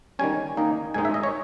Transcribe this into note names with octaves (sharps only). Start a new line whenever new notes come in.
D#3 G3 C#4 G#5
D#3 A#3 D#4
G#2 D#3 G#3 D#4 G#5
E5
D#5
C#5